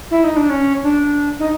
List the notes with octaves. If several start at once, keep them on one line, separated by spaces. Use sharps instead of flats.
E4
D#4
D4
C#4
D4
D#4